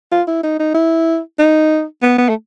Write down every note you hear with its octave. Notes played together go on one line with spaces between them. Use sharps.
F4
E4
D#4
D#4
E4
D#4
B3
B3
A3